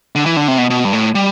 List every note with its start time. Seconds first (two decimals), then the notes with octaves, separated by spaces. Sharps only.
0.15 D3
0.26 E3
0.37 D3
0.48 C3
0.58 B2
0.70 B2
0.85 G2
0.93 A2
1.15 G3